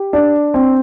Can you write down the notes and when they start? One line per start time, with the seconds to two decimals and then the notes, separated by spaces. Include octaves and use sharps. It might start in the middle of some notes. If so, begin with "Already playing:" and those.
Already playing: G4
0.13 D4
0.54 C4